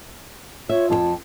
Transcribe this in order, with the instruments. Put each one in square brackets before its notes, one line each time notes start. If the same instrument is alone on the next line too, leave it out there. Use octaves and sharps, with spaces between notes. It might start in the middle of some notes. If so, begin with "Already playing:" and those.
[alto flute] F4 [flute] C#5 [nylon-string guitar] E5
[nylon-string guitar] F2 G4 G5 [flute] A5